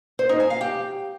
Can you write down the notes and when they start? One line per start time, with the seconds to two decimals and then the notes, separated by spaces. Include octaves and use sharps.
0.19 C5
0.29 D#4
0.40 G#5
0.50 F5
0.61 G4